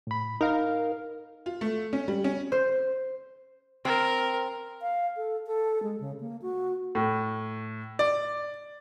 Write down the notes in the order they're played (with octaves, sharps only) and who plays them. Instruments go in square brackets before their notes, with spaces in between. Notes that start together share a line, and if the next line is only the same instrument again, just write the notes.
[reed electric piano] A2 B5
[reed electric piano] D#4 F5 [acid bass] A#4
[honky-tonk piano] F4
A3
C#4
G3
C#4
[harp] C5
[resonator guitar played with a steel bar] C4 [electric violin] A#4
[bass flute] F5
A4
A4
G#3
C#3
A#3
F#4
[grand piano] A2
D5